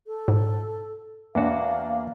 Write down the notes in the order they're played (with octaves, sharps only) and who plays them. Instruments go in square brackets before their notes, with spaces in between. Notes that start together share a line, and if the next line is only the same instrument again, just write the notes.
[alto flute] A4
[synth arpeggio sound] G#2
[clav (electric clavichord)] E2 F#4 [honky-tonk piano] A#3 D4 [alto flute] F5